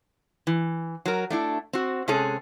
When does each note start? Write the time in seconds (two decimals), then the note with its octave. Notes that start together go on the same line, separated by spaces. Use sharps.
0.47 E3
1.06 F#3 A#4
1.30 A3 D4 E4
1.73 C4 F#4
2.08 C3 G#3 C#4 G#4 A4